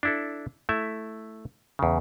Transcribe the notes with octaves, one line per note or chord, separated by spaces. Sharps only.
D4 E4 A4
A3 E4 E5
E2 C#3